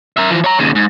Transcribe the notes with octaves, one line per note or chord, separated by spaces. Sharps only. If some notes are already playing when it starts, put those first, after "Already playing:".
A#4 E5
E3 F3
C#5 A#5
D#2 C#3
G#2